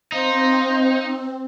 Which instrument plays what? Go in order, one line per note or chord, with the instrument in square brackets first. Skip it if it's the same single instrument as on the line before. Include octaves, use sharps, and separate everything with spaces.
[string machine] C4 [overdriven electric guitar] D#4 [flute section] C5 D#5 F5